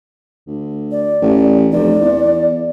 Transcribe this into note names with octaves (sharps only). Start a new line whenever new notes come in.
D2
D5
A1
F1 D5
E2